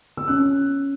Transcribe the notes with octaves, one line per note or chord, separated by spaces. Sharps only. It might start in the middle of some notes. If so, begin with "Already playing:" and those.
E6
C#4 F#6